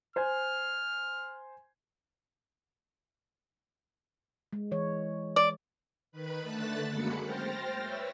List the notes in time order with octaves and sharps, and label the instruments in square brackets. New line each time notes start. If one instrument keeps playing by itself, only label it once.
[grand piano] C5 G#5 [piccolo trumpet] F6
[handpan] G#3
E3 C#5
[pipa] D5
[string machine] D#3 B4 B5
D3 A3 A5 F#6 A6 B6
F#2 F#3 G#3 A#3 B5 C#7
C5 G5 F6 A6 A#6
B4 C#5 E5 E6